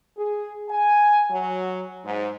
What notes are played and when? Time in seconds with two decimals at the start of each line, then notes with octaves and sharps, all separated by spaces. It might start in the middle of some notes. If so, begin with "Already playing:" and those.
0.17 G#4
0.69 G#5
1.31 F#3
2.05 G#2